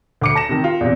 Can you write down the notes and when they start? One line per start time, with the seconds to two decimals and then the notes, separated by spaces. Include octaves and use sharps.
0.21 D2 D6 C#7
0.35 A5 A#6 E7
0.49 C3 D#3
0.64 F4
0.81 E2 C3